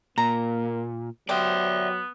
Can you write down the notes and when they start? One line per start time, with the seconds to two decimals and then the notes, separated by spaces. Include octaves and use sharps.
0.18 A#2 A#3 A#5
1.29 F#3 B3 G4 C5 D5 E5